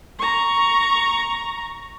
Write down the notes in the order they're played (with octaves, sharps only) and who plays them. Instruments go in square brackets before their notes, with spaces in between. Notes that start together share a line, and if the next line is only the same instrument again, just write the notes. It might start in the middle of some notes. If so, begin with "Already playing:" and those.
[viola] A#5 C#6